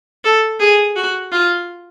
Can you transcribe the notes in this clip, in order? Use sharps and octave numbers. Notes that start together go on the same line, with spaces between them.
A4
G#4
F#4
F4